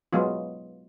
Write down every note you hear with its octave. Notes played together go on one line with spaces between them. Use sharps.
F#3 G#3 B3 F4